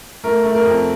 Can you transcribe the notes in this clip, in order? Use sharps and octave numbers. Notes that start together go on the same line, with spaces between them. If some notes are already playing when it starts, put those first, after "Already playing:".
A3 A#4
A3
A#4
F2